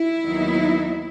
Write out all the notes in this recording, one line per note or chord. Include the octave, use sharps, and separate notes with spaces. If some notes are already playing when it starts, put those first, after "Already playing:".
Already playing: E4
D#2 D#3 F#3 B3 D#4